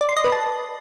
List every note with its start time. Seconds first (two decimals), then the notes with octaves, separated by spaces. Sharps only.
0.01 D5
0.09 C6
0.17 D#5
0.24 B4
0.32 A5